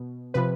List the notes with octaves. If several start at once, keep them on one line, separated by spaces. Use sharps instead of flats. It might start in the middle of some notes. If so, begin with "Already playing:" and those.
Already playing: B2
C3 F3 B4